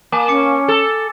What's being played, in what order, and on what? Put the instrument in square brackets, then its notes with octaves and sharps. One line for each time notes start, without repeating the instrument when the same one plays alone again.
[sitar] A#3 [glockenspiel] G#5 A5 D6
[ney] C#4 [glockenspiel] D6 C#7
[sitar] A4